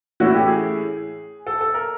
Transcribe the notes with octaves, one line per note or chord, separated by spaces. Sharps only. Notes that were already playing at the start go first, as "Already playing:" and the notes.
A2 E3 A3 C#4 E4 F#4
G4
G#4
A4
A4
A#4